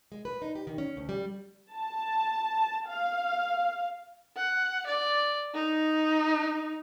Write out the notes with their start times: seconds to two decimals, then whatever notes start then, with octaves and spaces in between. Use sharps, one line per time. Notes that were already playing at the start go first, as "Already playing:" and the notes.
0.12 G#3
0.25 B4
0.42 D#4
0.55 G4
0.67 D#3
0.78 C#4
0.97 D2
1.09 G3
1.74 A5
2.88 F5
4.36 F#5
4.87 D5
5.55 D#4